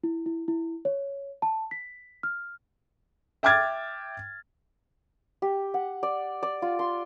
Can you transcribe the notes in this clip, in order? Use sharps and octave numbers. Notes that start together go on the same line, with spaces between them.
E4
E4
E4
C#5
A5
B6
F6
E5 G5 D6 F6 G#6 A6
G4
F#5
D5
D5
F4
C6